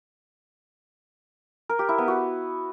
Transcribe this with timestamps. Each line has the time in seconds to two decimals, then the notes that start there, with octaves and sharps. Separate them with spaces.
1.69 A#4
1.79 G4
1.89 E4
1.98 B3
2.08 F#4